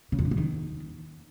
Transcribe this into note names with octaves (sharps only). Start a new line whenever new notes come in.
C#3
F2
D3
E3
D#3